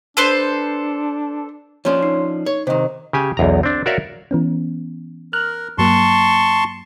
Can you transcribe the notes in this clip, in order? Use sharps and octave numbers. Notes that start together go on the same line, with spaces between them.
D4 A4 B4 C5
F3 C#4 D4 C#5 C6
D#4 C7
C#5
C3 D#3 C5 D#5
C#3 G4 G#5
B1 E2 A#5
C4 D4
F#4 A#4 C#5 D5 E5 F5
E3 B3 C#4
A#4 F6 F#6
G2 F#3 A#3 A5 C6 C#6